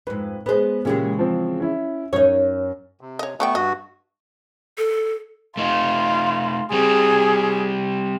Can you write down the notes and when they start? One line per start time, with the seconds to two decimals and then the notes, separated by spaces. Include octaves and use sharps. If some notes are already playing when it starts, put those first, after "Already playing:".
0.07 F2 G#2 B4
0.46 G#3 B3 G#4 B4 C5
0.85 A#2 C#3 E3 G#3 C#4 G4
1.19 F3 C4
1.60 C#4 E4
2.13 F#2 D#4 C#5
3.01 C3
3.19 C#5 D#5
3.40 F#3 A3 B3 D5 G5 C#6
3.55 G2 F#4 D#5
4.78 A4
5.57 A3 D#4 F4
6.72 G3 C4 G#4